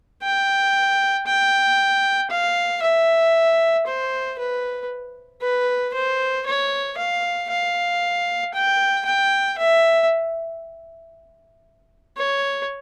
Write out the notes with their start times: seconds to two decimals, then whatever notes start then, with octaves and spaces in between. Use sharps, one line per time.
0.23 G5
1.27 G5
2.31 F5
2.83 E5
3.86 C5
4.39 B4
5.42 B4
5.94 C5
6.46 C#5
6.98 F5
7.50 F5
8.54 G5
9.06 G5
9.58 E5
12.17 C#5